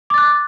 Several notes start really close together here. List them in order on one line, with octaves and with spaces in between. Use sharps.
D6 A6 F#6